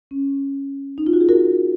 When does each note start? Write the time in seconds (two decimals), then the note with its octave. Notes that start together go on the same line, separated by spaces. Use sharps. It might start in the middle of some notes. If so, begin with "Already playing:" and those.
0.11 C#4
0.98 D#4
1.07 F4
1.13 F#4
1.21 G#4
1.29 F#4 A#4